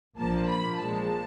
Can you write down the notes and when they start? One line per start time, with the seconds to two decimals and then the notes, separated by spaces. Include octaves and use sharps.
0.17 A#1 A#2 F3 A#3 A5
0.49 B5
0.79 A#2 F3 G#3 A5